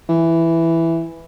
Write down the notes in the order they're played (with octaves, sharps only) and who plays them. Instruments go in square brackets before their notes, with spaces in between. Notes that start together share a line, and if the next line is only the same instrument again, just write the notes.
[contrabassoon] E3